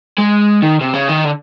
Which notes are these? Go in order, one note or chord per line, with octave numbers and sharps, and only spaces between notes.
G#3
D#3
C3
C#3
D#3
D3